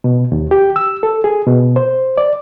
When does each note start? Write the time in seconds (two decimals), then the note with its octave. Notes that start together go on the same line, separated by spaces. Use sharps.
0.04 B2
0.32 D#2
0.51 G4
0.76 E6
1.03 A4
1.24 G#4
1.47 B2
1.76 C5
2.18 D5